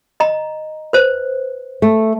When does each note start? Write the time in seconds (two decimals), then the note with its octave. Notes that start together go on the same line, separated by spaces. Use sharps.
0.20 D#5 A#5
0.93 B4 C5
1.82 A3